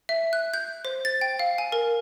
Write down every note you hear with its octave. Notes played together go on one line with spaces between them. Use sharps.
E5
F#6
G6
C5
A6
G5
F5
G#5
A#4